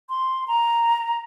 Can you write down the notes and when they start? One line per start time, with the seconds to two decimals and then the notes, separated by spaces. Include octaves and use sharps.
0.10 C6
0.48 A#5